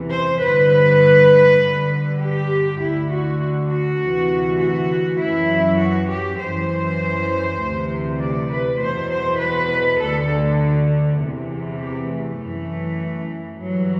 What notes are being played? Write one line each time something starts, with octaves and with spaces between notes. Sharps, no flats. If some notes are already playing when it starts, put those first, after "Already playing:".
Already playing: E2 C3 E3
C5
G2 D3 B4
G2 D3
G4
D2 D3 E4
F#4
F#4
D2 C3 E3
F#4
F#2 E3 E4
F#4
G4
F#2 E3 C5
D2 C3 E3
D5
B4
E2 B2 C5
C5
B4
D2 D3 A4
E2 C3 E3
G4
A3
F#2 E3
G2 E3 F#3